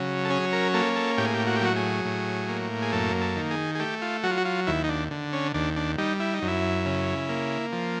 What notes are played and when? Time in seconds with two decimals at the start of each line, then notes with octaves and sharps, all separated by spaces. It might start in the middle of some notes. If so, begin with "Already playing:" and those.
Already playing: C#3 F#3
0.25 A4
0.30 C#4 G#4
0.53 A#4
0.74 A#3 A4
0.96 A4
1.18 A2 G4
1.26 G#4
1.34 G4
1.47 F#4
1.56 G4
1.61 F#3 F#4
1.76 G#4
2.05 A2
2.49 A#3
2.82 G#4
2.92 F#2 A4
3.21 A4
3.36 D#3
3.51 G#4
3.75 G#4
3.80 A3 G4
4.02 F4
4.23 F#3 F#4
4.31 F4
4.38 F#4
4.45 F4
4.67 D#2 E4
4.84 D#4
4.89 D4
5.11 D3
5.33 C#4
5.54 D#2 D4
5.76 D4
5.98 G3 D#4
6.20 E4
6.34 D#4
6.42 F#2
6.48 E4
6.86 C#3
7.29 A#3
7.73 F3